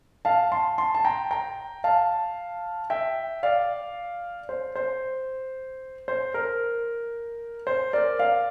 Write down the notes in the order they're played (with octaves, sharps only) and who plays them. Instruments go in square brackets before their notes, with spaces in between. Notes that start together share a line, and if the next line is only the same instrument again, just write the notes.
[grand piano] F5 A5
A5 C6
A5 C6
A5
G5 A#5
G5 A#5
F5 A5
E5 G5
D5 F5
C5
C5
C5
A#4
C5
A#4 D5
D5 F5